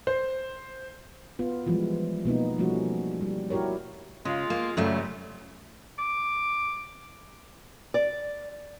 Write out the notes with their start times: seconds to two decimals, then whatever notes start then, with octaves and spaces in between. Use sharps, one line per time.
0.07 C5
1.39 B3 F4
1.67 E3 F3 G3 G#3
2.25 B2 A#3 B3 D#4
2.58 F3 G3 A3 C#4 F#4
3.21 G3
3.50 E4 F#4 G4 A#4 C#5
4.25 C#3 G#3 F4
4.50 A#3
4.77 F#2 A#2 C#3 G3 A3
5.99 D6
7.94 D5